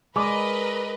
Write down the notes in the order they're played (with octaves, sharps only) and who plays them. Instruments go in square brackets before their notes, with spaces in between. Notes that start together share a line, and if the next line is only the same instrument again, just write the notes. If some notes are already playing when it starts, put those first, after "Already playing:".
[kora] G#3 [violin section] A#4 B4 D#5 [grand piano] D5 D6